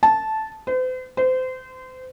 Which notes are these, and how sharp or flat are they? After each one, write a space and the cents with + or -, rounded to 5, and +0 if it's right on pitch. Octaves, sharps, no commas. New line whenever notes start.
A5 -10
C5 -45
C5 -30